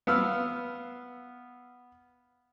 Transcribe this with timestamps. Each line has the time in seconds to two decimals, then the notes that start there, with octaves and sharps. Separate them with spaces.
0.07 B3 F5 E6 F6